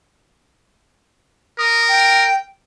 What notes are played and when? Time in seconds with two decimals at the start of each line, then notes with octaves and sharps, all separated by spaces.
1.59 A#4 D#6
1.88 G5